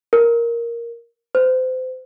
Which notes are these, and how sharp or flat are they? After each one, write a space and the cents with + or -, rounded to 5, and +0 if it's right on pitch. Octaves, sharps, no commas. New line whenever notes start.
A#4 +5
C5 -30